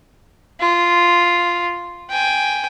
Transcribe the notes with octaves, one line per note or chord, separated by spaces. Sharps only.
F4
G5 G#5